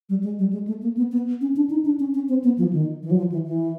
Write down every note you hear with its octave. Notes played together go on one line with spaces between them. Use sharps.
G3
G#3
G3
G#3
A3
A#3
B3
B3
C#4
D4
D#4
D4
C#4
C#4
C4
B3
F3
D#3
E3
F#3
F3
E3
E3